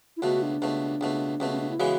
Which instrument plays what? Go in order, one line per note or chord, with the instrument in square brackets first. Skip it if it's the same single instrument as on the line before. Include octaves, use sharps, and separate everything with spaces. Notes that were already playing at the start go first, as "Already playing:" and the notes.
[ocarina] E4
[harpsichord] C#2 B2 A3 [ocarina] F#4
[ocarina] D4
[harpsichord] C#2 B2 A3
C#2 B2 A3
[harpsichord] C#2 B2 A3 [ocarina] C#4
[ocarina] C#4
D4
E4
[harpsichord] C#3 E3 G#3 B3 [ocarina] F#4